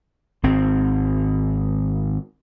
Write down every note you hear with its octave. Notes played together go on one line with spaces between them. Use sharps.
G#1 C4